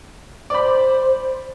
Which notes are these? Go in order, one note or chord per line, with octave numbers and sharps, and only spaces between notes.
C5 D5 B5